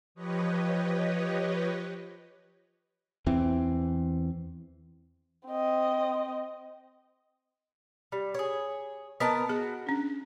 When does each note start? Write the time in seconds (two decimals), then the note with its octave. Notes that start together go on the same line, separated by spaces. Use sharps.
0.15 F3 G4 B4 C#5 D#5
3.26 E2 E3 C4
5.48 C4 D#5
8.12 G3
8.34 G#4 C#5
9.20 B3 A#4 D#5 A5
9.49 F#4 G#4
9.86 C#4 D4